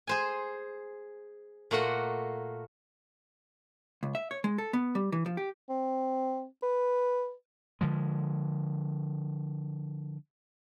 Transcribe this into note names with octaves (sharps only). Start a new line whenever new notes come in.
G#4 C5 G#5
A#2 A3 A#3 F#4 F#5
C#2
E5
C#5
G#3
A4
B3
G3
E3
F3
G4
C4
B4
D3 F3 G#3